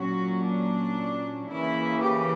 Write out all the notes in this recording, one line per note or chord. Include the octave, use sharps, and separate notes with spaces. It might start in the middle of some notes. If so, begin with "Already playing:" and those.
Already playing: A#2 F#3 C#4 F#4
D4
C#3 E3 A#3 E4
G4